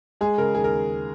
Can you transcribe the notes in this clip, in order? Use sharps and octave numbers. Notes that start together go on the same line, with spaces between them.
G#3 G#4
C#3 A#4
D#2 G#4
A#4